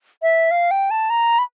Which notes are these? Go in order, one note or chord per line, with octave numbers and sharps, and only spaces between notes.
E5
F5
G5
A5
A#5
B5